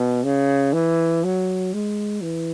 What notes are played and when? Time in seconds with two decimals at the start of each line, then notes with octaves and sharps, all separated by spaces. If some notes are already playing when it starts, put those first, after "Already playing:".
Already playing: B2
0.24 C#3
0.73 E3
1.24 F#3
1.73 G#3
2.22 E3